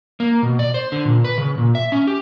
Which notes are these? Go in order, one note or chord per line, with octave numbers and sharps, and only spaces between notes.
A#3
B2
D5
C5
D3
A#2
B4
C#3
A#2
E5
C#4
G4